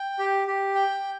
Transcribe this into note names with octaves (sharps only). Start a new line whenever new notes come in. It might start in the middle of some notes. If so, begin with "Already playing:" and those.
Already playing: G5
G4
G4
G5